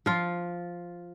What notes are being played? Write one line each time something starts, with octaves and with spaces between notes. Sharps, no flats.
F3 F4